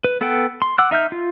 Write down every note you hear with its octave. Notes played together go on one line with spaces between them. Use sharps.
B4
B3 A4 B4 F#5 G5
C6
F#5 D6 E6 F#6
D#4 E5 F6 G6
F4